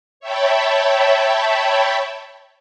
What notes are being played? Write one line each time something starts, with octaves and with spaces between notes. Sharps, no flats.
C#5 E5 G5 A5 B5